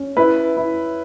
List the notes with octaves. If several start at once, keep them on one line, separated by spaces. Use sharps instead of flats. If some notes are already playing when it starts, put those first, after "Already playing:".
Already playing: C#4
E4 B4
E4